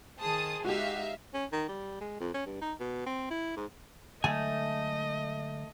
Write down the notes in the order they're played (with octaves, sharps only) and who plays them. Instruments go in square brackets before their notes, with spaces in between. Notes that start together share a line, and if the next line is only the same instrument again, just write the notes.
[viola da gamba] D#3 G#4 C5 [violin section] A5 D#6
[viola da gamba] G#3 D#4 [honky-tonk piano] F#4 G4 [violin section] E5 F5
[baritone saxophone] C#4
D#3
G3
G#3
F2
C#4
G2
D#4
B2
C4
E4
G#2
[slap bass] D3 F#3 G#3 [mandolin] A3 [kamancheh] D#5 [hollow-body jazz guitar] G#5